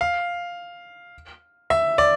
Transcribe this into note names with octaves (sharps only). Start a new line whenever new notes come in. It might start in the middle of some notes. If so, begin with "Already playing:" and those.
F5
E5
D5